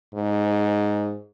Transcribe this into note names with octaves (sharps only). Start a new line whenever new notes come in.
G#2